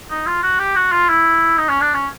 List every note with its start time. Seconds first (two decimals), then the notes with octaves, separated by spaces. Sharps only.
0.11 D#4
0.27 F4
0.43 F#4
0.59 G4
0.76 F#4
0.92 F4
1.09 E4
1.58 D#4
1.69 C#4
1.81 D4
1.94 C#4